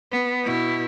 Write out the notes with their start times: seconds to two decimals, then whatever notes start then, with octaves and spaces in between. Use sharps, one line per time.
0.12 B3
0.44 B2 E4